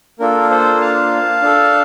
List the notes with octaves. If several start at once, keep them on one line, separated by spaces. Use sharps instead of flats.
A#3 D4 F4 A4 A#4
A4 C5
F5 A5
D4 A4